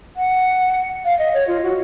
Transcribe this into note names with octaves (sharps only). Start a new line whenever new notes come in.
F#5
F5
D#5
C#5
F4
F#4